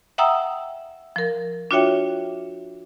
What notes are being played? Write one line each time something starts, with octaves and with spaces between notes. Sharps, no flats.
E5 F#5 G5 A#5 D#6 E6
F3 A#4
D4 F4 F#4 C#5 E5 G5